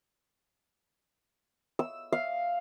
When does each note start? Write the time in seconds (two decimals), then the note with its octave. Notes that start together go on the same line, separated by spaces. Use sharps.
1.79 E6
2.13 F5